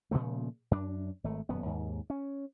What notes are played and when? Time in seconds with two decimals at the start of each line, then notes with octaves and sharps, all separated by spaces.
0.11 A#2 C#3 F3 A3
0.71 F#2 D4
1.24 G#1 A3
1.49 D#1 F#2 B3
1.66 D#2 G#2
2.10 C#4